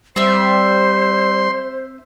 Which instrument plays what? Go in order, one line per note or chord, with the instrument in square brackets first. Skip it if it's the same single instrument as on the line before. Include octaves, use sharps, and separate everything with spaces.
[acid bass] G3 [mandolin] C4 E5 [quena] C5 [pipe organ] C6